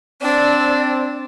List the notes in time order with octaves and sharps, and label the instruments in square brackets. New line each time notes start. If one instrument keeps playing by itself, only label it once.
[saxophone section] C4 [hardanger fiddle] D4 [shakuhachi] D5